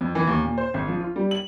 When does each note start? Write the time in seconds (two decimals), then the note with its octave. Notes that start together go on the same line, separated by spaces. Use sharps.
0.01 F2
0.15 E3
0.27 D#2
0.43 A#2
0.58 C5
0.74 G#1
0.88 F3
1.00 F4
1.16 G3
1.31 F#7